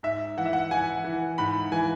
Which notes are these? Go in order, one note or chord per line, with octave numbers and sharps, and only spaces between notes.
G#2 E5
E3 F#5
E5
F#5
E3 G#5
E3
G#2 B5
E3 G#5